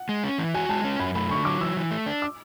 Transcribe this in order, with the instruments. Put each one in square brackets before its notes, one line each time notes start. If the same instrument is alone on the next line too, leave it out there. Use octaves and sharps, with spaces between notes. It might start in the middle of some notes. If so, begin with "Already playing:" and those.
Already playing: [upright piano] F#5
[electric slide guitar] G#3
C#4
E3
[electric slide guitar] F#4 [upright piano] G#5
[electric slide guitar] G#3 [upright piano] A5
[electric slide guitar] C#4
[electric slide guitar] F#2 [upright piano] B5
[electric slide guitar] A3 [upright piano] B5
[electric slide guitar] D3 [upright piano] C#6
[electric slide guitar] F#3 [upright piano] D6
[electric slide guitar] E3 [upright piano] E6
[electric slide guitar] E3
A3
D4
[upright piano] D6